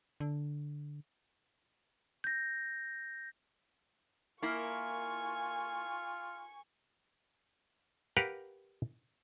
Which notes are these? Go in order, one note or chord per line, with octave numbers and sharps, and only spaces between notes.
D3
G6 A#6
A#3 E4 F4 A#4 G#5 C#6
G4 A#4 B4 F5 F#5